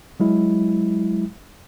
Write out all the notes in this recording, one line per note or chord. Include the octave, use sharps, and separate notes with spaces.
F#3 G#3 E4